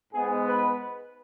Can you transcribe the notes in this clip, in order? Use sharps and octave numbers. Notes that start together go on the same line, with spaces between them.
G#2 G#3 B3 G#4
B4